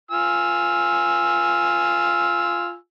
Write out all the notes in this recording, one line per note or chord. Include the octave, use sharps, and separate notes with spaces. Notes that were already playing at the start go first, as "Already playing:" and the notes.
F4 G#5 E6